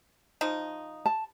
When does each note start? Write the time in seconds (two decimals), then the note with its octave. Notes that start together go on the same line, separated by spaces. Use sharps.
0.41 F3 D#4
1.06 A5